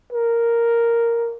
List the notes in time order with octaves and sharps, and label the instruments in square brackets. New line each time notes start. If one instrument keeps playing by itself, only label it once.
[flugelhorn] A#4